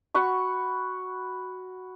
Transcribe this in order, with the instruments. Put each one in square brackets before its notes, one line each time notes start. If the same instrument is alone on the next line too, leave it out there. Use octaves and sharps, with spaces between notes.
[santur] F#4 F#5 B5 C#6